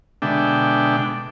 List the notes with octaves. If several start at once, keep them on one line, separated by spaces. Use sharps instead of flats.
B2 D3 G#3 D4 E5 G5